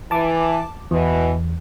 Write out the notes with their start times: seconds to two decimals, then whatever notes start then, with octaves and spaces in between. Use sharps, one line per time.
0.11 E3 A5 D6
0.91 E2 B2 E3